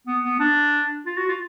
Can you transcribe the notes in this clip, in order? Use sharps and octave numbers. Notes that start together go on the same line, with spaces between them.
B3
B3
D4
F4
F#4
F4